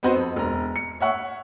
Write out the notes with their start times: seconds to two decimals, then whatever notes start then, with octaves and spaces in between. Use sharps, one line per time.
0.03 B3 C4 D#4 F#4 B4 C5
0.16 F2
0.36 E1 A#5
0.76 C#7
1.01 C#5 E5 F#5 C#6